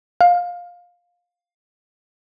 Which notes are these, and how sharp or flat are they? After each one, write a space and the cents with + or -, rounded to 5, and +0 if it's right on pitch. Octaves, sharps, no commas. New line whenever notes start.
F5 +15